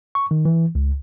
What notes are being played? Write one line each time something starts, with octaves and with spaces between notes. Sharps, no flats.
C#6
D#3
E3
C#2